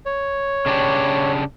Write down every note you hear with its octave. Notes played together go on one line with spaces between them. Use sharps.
C#5
C#3 D4 G4